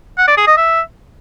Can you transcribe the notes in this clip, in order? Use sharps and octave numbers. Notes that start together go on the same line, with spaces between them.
F#5
D5
G#4
D#5
E5